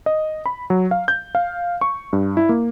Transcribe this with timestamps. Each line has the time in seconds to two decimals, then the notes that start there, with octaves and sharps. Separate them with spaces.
0.06 D#5
0.46 B5
0.70 F#3
0.91 F5
1.08 G6
1.35 F5
1.81 C#6
2.13 G2
2.37 E4
2.49 A#3